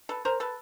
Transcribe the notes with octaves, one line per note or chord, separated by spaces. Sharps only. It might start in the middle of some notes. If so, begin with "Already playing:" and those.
A4 B4
A#4 C5
A4 B4